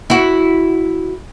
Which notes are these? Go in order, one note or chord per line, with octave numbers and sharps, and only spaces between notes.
E4 F#4